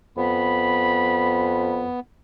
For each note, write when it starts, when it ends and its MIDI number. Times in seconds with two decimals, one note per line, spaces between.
0.17 1.89 41
0.17 2.00 59
0.17 1.90 83